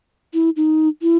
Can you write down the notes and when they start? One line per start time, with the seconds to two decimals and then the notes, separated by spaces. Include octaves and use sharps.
0.34 E4
0.57 D#4
1.02 E4